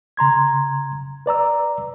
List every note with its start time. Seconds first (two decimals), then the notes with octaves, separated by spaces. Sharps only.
0.17 C#3 A#5 C6 G#6
1.26 B4 D5 A#5 E6